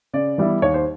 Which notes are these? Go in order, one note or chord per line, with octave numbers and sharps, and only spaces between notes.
C#3 D5
E3 G3 B3 E4
D#2 C#5
C5